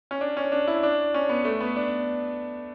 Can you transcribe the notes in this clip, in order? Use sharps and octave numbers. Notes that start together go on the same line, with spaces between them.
C#4
D4
C#4
D4
E4
D4
C#4
B3
A3
B3
D4